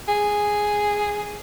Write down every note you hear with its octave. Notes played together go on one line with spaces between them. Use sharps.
G#4